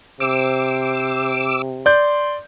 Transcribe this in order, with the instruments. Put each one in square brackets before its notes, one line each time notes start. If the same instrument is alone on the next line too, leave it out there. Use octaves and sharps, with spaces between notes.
[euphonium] C3 [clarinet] C5 [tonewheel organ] D6 E6
[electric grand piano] D5 G6 [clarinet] C6